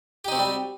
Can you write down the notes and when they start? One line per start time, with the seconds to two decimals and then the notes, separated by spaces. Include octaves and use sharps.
0.24 G4
0.28 D#4
0.32 C4
0.35 F#4
0.39 G3